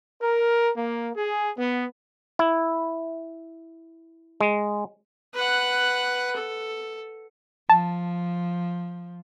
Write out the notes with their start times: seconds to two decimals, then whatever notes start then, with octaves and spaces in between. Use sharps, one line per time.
0.22 A#4
0.76 A#3
1.16 G#4
1.58 B3
2.39 E4
4.41 G#3
5.34 B4 F#5
6.36 A4
7.70 F3 A5